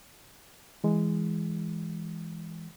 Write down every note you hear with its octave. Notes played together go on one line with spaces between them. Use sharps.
E3 G#3